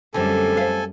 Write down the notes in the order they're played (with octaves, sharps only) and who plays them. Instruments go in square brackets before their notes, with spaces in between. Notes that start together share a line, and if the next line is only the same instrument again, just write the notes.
[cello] F#2 G3 [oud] D3 A3 C4 [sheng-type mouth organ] A4 G#5
[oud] C5 E5 F5